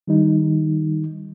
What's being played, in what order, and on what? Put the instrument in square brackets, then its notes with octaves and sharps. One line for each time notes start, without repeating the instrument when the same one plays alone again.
[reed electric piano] D#3 G3 D#4